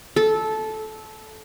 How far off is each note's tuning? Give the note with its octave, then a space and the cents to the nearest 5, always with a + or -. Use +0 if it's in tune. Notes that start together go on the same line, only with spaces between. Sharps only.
A4 -15